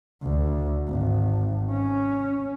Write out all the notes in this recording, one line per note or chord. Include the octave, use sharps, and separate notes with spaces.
D2
G#1
C#4